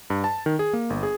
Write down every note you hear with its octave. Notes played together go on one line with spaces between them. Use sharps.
G2
A5
D#3
G#4
A#3
G1
G#4